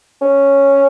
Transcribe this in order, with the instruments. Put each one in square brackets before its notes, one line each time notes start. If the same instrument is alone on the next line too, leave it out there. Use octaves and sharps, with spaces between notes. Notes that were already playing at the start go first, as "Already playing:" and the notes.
[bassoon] C#4